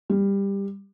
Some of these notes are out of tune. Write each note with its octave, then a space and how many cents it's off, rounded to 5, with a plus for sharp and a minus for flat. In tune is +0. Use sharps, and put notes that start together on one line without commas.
G3 +15